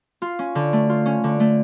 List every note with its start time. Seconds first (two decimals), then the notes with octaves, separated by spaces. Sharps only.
0.22 F4
0.39 C#4
0.55 D3
0.73 A3
0.89 F4
1.06 C#4
1.24 D3
1.40 A3